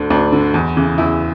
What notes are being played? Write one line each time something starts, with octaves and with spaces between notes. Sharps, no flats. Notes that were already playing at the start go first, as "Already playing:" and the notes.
Already playing: D2 D3
D2 D4
D3
E2
C#3 E3
E2 E4